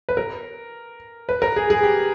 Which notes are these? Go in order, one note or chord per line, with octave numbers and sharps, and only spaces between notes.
B4
A#4
B4
A#4
G#4
G#4
G4